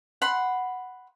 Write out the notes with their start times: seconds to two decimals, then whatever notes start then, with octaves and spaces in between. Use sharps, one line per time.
0.22 F#5 B5 C6